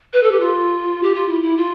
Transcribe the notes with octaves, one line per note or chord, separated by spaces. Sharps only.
B4
A4
G4
F4
G4
F4
E4
E4
F4